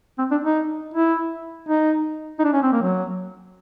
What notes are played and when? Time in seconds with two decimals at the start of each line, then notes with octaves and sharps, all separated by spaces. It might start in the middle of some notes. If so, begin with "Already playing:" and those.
0.19 C4
0.31 D4
0.44 D#4
0.94 E4
1.69 D#4
2.39 D#4
2.44 D4
2.53 C#4
2.63 C4
2.73 A#3
2.82 F#3